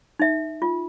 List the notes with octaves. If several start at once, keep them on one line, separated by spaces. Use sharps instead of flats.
D#4 E5
F4